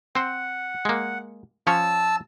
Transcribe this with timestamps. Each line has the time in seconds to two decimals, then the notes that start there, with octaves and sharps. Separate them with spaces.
0.15 C4 C5 F#5
0.85 G#3 A#3
1.67 F3 C#4 C#5 A5 E6